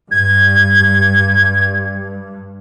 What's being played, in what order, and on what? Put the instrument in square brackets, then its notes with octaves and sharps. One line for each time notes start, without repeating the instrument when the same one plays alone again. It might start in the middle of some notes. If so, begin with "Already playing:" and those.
[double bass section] G2 [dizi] G#6